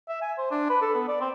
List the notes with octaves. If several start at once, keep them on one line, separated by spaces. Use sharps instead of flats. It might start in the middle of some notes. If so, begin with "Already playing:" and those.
E5
G#5
C5
D4
B4
A4
B3
D5
C4